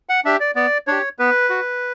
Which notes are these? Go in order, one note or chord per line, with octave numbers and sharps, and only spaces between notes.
F#5
D4 G4 E5
D5
B3 D5
D4 G4 C#5
B3 B4
F#4